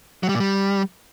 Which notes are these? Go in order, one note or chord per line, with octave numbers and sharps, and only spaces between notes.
F#3
G3
A#2
G3